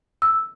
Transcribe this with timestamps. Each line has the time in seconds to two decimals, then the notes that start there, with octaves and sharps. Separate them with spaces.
0.22 E6